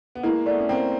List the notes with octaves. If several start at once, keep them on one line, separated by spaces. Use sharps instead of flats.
B3
G#3 A#3 E4
A3 B3 D5
C#4
A#3 C4 G5